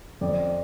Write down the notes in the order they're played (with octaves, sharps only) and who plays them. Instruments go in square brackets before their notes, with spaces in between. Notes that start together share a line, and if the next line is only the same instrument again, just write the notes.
[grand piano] F2 D5